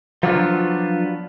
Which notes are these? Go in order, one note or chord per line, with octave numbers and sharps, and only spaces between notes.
F3 F#3 B3 D4 F4